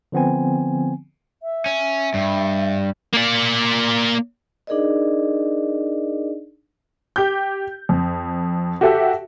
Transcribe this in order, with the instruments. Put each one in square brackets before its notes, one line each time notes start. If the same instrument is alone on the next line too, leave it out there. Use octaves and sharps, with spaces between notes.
[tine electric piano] D3 F3 B3 C4 G#5
[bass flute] E5
[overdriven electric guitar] C#4
G2
[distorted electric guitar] A#3 D5
[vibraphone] D4 D#4 G#4 A#4 D5 D#5
[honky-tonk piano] G4 G6
F2
F#4 G4 A4 E5